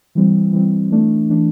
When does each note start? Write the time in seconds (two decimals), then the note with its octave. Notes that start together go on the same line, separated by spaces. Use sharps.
0.15 E3 G3 C4
0.53 E3 G3 C4
0.91 E3 A3 D4
1.30 E3 A3 D4